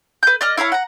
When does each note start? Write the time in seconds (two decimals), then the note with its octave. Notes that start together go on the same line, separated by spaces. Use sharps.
0.23 B4 G6
0.41 D5 D#5 F6
0.57 E4 C#5 F5 A#5
0.72 F#5 A#5